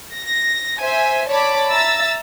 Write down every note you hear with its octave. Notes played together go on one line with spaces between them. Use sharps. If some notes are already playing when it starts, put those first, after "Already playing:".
A#6
C5 E5 G#5
C#5 D5 A5 B5 D6
E5 A#5 E6 A6